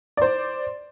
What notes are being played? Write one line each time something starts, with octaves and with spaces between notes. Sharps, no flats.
C5 D5